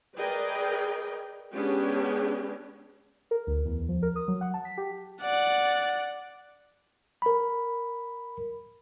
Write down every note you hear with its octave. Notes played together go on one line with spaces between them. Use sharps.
G#4 A#4 B4 D5 D#5 G5
G#3 B3 C#4 D4 G4 G#4
A#4
D2
E2
F3
A#4
D#6
F#3
F#5
A5
B6
G4
D5 F#5
A#4 B5